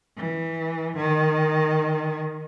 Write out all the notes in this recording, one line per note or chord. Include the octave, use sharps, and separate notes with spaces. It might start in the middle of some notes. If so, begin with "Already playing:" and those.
E3
D#3